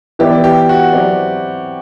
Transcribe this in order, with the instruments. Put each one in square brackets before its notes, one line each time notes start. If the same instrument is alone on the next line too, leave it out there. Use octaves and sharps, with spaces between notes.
[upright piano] E3 B3 E4 B4 D5 [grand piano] G4
[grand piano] G4
F#4
[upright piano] F#3 C4 E4 B4 D5